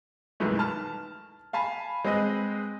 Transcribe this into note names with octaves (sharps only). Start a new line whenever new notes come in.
B1 F#2 D#3 E3 G#3 A3
A5 F6
F5 G#5 A5 B5
G#3 C4 G#4 B4 D#5